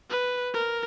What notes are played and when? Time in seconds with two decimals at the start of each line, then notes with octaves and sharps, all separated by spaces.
0.10 B4
0.54 A#4